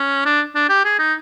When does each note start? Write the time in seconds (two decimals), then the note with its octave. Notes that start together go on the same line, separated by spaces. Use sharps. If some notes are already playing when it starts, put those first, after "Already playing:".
Already playing: C#4
0.26 D4
0.56 D4
0.70 G4
0.85 G#4
0.99 D#4